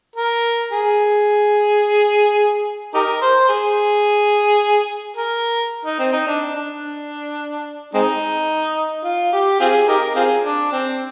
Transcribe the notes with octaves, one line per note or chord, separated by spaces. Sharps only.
A#4
G#4
D#4 G4 A#4
C5
G#4
A#4
D#4
C4
D#4
D4
D4
G#3 C4 D#4
F4
G4
C4 F4 G#4
D#4 G4 A#4
C4 F4 G#4
D4
C4